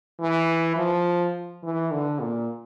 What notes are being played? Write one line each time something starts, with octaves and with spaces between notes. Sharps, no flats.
E3
F3
E3
D3
A#2